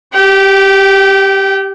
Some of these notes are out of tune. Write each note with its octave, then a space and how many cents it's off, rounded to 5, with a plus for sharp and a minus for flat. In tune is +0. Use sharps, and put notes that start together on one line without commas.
G4 +0 G5 -30